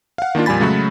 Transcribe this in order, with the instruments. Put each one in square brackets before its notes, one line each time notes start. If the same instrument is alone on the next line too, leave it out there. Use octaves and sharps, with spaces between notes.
[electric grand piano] F5 F#5
D#3 A#3 D4 F4
F2 A#2 G3 G#5 B5 A6
C#3 F#3 G#3 A3 F#4 B5